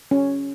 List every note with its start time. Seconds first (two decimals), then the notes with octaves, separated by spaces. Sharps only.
0.11 C#4